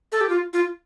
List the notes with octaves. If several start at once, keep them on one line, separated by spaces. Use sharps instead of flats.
A4
G4
F4
F4